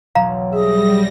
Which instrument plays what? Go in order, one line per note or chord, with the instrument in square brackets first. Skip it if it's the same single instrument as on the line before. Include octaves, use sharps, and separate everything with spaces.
[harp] E1 B1 F#3 [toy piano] F5 A#5
[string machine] G3 A#6 [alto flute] G#4 [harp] E5